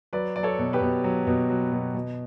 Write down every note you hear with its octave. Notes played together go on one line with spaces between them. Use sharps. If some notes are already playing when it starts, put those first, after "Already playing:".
F#3 B4 D5
F#3 D5
A4 C#5
B2
G4 B4
B2
F#3
B2
F#3
B2
B2